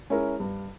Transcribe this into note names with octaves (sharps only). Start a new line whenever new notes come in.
G#3 C#4 E4 A#4
G2